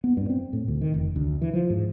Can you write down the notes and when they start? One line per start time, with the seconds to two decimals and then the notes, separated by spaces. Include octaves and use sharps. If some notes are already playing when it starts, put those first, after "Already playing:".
0.04 B3
0.17 G2
0.30 C4
0.53 A2
0.68 D2
0.81 D#3
0.94 F1
1.16 D2
1.42 E3
1.53 F3
1.70 G#2